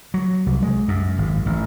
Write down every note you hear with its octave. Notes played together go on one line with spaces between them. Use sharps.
F#3
C2
G#3
F#2
G#1
A1